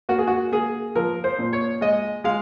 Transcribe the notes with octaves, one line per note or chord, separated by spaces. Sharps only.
A#3 F#4
G#4
F#4
A#3 G#4
F3 A#4
C5
A#2
C#5
G#3 D#5
G#3 F5